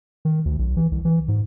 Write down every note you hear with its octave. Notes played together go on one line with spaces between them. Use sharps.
D#3
D2
B1
E3
C2
E3
G#2